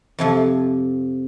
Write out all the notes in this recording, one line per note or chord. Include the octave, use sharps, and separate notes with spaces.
F2 C3 F3